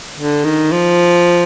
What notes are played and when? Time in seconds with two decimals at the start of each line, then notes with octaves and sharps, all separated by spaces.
0.17 D3
0.45 D#3
0.72 F3